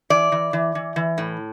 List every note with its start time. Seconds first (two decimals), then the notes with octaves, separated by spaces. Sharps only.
0.10 E3 D5
0.32 E3
0.53 E3
0.75 E3
0.96 E3
1.18 A2